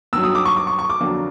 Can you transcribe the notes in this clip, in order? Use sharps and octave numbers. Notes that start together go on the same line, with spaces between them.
G2 D#3 F#3 E6
D#6
D6
C#6
D6
C#6
C#6
D6
F2 D3 F#3 A#3 D4